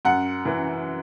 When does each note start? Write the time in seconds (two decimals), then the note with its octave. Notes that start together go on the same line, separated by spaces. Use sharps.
0.05 F#2 F#5
0.45 E3